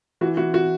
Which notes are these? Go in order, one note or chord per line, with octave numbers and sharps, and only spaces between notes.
E3 F#4
E3 F#4
F#4